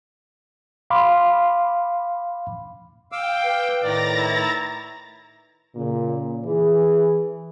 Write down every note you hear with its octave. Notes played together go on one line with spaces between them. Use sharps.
F5 B5 C6 D6
F5 G5 D6 E6
B4
A2 D#3 D5 A#5 A6 A#6
E4
A#2 C#3
E3 G#4